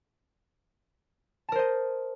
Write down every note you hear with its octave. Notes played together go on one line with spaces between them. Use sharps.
A#4 C5 D#5 A5